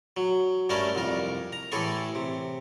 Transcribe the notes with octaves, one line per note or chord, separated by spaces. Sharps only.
F#3
G2 G3 A3 C#4 A#4 A5
C2 F2 A#4
A#5
A1 A2 E3 G#4 A4 C#6
C3